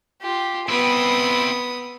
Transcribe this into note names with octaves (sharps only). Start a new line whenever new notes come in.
F4 G4
B3 C4 E4 D#6